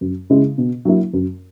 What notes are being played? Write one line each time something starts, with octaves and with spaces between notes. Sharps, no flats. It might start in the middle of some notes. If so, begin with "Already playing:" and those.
F#2
C#3 G#3 C#4 E4
B2
F#3 A#3 E4
F#2